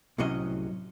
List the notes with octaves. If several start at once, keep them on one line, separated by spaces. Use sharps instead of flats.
C2 A2 C3 F#3 C#4 D#5